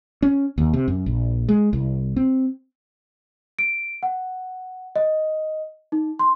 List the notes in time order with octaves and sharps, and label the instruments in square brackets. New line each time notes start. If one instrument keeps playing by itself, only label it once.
[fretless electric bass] C#4
D#2
C3
F#2
A#1
G#3
C2
C4
[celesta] D7
F#5
D#5
D#4
C6